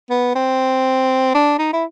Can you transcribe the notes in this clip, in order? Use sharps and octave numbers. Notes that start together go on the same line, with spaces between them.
B3
C4
D4
D#4
E4